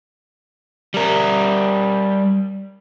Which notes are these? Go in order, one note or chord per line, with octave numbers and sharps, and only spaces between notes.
G3 A#4